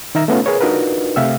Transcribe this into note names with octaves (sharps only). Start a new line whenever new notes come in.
D#3 D#4 E5 A#5 E6
A3 B3 C#4 F4
G#4 A#4 B4 C#5
D4 D#4 F4 F#4 A#4 B4
C3 A3 E5 F5 G5 E6